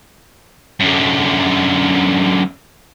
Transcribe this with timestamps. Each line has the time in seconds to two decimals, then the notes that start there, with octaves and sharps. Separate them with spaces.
0.80 F#2 D3